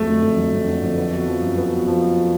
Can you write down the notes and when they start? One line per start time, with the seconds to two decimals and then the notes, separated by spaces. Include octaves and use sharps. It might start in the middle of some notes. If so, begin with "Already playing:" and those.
Already playing: F2 F#3 A3
0.08 D3
0.23 F2
0.38 F#3
0.52 F2
0.66 D3
0.81 F2
0.96 B3
1.12 F#4
1.26 F3
1.41 F#2
1.57 B3
1.71 F#4
1.87 F3